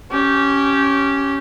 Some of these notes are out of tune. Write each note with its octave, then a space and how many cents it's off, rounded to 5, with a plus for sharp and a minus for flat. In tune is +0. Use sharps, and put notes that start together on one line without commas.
C#4 +0 G4 -15